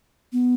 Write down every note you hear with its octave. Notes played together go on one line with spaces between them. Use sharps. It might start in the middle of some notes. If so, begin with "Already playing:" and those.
B3